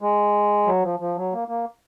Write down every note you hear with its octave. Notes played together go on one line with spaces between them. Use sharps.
G#3
F#3
F3
F3
F#3
A#3
A#3